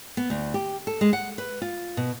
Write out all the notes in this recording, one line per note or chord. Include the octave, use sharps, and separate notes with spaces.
B3
D2
G4
A4
G#3
F#5
B4
F4
B2